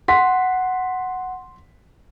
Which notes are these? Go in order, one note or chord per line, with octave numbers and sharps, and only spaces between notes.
F#5 C6 B6